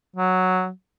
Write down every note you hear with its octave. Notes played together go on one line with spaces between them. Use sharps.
F#3